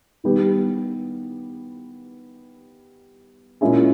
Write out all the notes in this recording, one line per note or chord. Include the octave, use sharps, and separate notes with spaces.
D#3 G3 B3 G4
A#2 G#3 C#4 E4 G#4